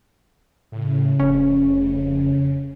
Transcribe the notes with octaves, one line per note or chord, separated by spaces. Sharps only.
A2 C#3
F1 C#4